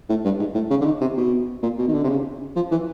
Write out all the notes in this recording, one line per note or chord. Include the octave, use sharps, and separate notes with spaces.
A2
G2
G#2
A2
C#3
D3
D#3
C3
B2
A#2
B2
D#3
D3
C3
C#3
F3
E3